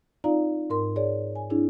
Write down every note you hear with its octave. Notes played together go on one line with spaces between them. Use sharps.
C4 D#4 F4 D5 F5 A#5
G#2 A#4 C6
G#4 C#5 D5
G#5
C4 D4 E4 G#4